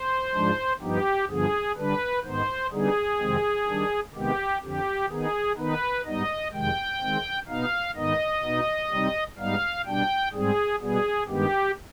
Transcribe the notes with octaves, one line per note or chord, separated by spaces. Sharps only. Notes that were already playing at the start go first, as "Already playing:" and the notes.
Already playing: C5
G#2 F3 G#3 D4
G2 F3 B3 D#4 G4
G2 D3 F3 B3 G#4
D3 G3 D4 B4
G#2 D#3 B3 D#4 C5
D3 G3 B3 D#4 G#4
F2 C3 D#3 G#3 C4
D#3 G3 D4
C3 D#3 G#3 B3 G4
F2 D3 F3 G4
D#3 B3 D#4 G#4
D#3 B3 D#4 B4
G#2 G3 B3 D#4 D#5
F2 C3 D#3 G#3 G5
D#3 G#3 C4
B2 B3 D#4 F5
G#2 D#3 B3 D#4 D#5
B2 B3 D#4
C3 G3 C4 D#4
G#2 G3 B3 D#4 F5
B2 G3 D4 G5
G#2 G3 C4 G#4
B2 G3 B3 G#4
G2 D#3 G#3 B3 G4